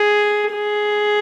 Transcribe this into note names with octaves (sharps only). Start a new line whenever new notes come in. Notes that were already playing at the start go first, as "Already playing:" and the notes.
Already playing: G#4
G#4